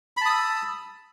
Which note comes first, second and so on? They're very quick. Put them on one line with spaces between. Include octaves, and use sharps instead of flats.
B5 A5 D#6 E6